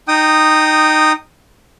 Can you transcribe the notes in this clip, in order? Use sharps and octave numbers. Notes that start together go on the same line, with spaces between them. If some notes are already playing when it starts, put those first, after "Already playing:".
D#4 G5 D#6